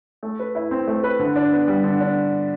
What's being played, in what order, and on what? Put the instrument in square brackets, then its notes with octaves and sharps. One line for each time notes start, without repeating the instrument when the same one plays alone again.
[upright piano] A3
B4
E4
C4
A3
B4
D3
D4
B3
G3
D3
D4